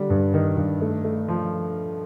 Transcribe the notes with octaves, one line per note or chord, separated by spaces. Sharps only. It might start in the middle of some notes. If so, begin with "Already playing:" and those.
Already playing: D3 G3
G2
D#3
G2
A3
A3
F3